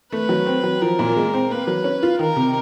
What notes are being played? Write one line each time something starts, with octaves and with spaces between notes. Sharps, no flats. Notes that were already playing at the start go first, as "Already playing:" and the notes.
A3 B4
F#3
C4
F#3
F3 A#4
A#2
G#3
C4
A#3 B4
F#3
C#4
F4
D#3 A#4
C3